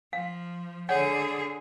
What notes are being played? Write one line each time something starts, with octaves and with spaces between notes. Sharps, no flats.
F3 F5
D3 G#4 C#5 D5 F#5